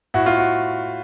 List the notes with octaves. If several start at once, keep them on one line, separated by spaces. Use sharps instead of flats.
A2 F#4
F4
F#4